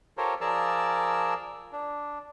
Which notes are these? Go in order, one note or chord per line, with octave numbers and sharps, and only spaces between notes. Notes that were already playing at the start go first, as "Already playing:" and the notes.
F4 G4 A4 A#4 C5 C#5
F3 G#4 A#4 D5 A5 E6
D4